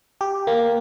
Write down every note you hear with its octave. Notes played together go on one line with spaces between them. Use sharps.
G4
A#3